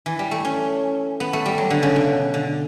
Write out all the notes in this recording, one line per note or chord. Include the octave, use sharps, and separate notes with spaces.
E3
G3
A3
C#4
B3
A3
G3
F#3
D3
C#3
B2
D3